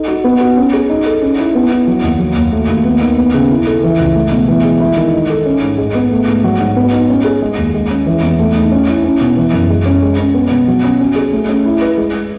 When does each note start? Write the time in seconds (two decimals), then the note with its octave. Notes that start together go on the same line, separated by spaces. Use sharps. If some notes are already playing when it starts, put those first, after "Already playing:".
Already playing: D#4 A4
0.08 F#4
0.24 B3
0.41 F#4
0.57 C#4
0.73 G#4
0.89 D#4
1.06 A4
1.22 C#4
1.39 E4
1.55 B3
1.71 E4
1.88 F#3
2.03 D#2
2.20 F#3
2.36 D#2
2.52 A3
2.69 D#2
2.85 B3
3.02 D#3
3.18 B3
3.34 C#3
3.50 E4
3.67 A4
3.83 E3
4.00 C#2
4.16 A3
4.32 B2
4.48 E3
4.64 G#3
4.80 E4
4.97 D#3
5.13 D#4
5.30 A4
5.46 C#4
5.62 G#2
5.78 G#3
5.95 B3
6.11 A3
6.28 G#2
6.44 F#3
6.60 G#2
6.76 B3
6.92 D#4
7.09 C#4
7.25 G#4
7.42 G#3
7.58 D#2
7.74 G#3
7.91 C#4
8.06 E3
8.22 E2
8.39 A3
8.56 D#4
8.72 C#4
8.88 E4
9.04 C#4
9.21 B2
9.37 E3
9.53 F#2
9.70 G#3
9.86 C#4
10.02 G#3
10.19 C#4
10.34 B3
10.51 B2
10.68 F#3
10.84 C#4
11.00 C#4
11.16 G#4
11.33 A3
11.49 C#4
11.65 E4
11.81 B4
11.97 G#3